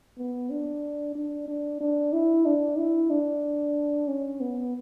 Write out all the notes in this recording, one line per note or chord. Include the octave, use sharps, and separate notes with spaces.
B3
D4
D4
D4
D4
E4
D4
E4
D4
C#4
B3